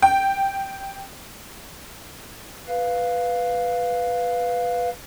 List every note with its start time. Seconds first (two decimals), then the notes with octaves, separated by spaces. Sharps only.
0.02 G5
2.67 B4 F5